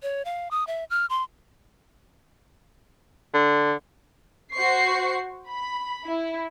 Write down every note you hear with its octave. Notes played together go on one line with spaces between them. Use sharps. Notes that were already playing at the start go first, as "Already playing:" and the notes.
C#5
F5
D#6
E5
F6
C6
D3
F#4 C5 C#6 C7
B5
E4